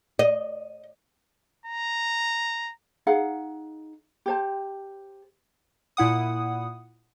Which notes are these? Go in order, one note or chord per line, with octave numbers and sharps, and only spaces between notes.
D#5
A#5
D#4 G#4 F5 F#5
G4 C5 A5
A#2 E4 F#5 D#6